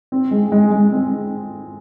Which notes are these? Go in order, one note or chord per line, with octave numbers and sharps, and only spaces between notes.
C4
G#3
G#3
G#3
C4